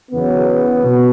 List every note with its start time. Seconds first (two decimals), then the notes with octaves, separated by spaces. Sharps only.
0.11 E2 C#3 F#3 B3
0.82 B2